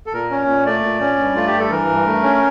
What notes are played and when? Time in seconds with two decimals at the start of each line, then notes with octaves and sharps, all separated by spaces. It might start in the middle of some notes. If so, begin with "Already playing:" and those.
0.06 A4
0.13 A#2 A#4
0.31 C#4
0.48 A#2
0.66 A3 D5
0.83 A#2
1.01 C#4
1.18 G2
1.35 A3 F4
1.47 G4
1.53 G2
1.59 A4
1.71 E3 A#4
1.89 G2
2.06 A3
2.23 C#4